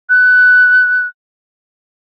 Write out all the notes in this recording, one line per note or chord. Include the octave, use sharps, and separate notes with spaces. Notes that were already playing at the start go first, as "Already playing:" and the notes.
F#6